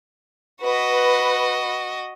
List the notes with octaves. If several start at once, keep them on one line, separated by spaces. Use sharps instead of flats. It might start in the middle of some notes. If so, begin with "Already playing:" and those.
F#4 B4 D#5